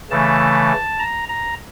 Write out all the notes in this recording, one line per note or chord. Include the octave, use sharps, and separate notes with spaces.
C#3 E3 A3 A5
A#5
A#5